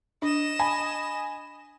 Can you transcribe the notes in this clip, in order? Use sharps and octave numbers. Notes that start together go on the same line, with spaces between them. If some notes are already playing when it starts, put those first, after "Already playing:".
D4 D#5 E7
G#5 B5